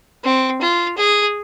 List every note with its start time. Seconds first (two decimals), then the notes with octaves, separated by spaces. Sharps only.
0.24 C4
0.61 F4
0.97 G#4